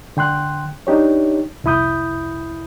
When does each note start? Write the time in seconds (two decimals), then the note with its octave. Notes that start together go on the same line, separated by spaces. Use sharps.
0.17 D3 G5 C6 F#6
0.87 D4 D#4 G4 C#5
1.64 C2 F2 E4 B5 D#6 G6